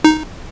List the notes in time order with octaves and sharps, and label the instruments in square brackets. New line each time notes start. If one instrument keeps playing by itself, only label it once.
[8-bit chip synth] D#4